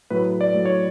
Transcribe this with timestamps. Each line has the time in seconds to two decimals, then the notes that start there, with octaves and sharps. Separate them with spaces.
0.10 A2 F#3 A3 B4
0.41 D5
0.54 A2 F#3 A3
0.66 C#5